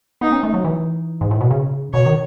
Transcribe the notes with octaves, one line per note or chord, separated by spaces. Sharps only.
B3 D#4
C#4
A3
F#3
E3
G#2
A2
B2
C#3
B2 C#5
D#3